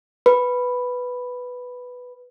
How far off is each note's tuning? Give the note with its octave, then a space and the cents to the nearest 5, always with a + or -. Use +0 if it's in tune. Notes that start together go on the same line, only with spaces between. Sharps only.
B4 +0 B5 +0